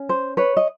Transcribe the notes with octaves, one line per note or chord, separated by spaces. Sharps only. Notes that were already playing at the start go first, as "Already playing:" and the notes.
Already playing: C#4
C5
B4 C#5
D#5